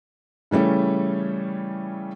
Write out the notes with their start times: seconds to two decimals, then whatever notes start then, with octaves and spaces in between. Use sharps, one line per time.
0.51 C#3 E3 G3 A3 C#4